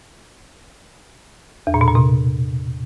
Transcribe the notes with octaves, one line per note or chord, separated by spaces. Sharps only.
E2
A#2
B2
A#2
C3